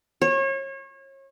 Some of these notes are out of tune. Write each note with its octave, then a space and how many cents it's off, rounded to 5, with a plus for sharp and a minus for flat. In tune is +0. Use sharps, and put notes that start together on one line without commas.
C#5 -35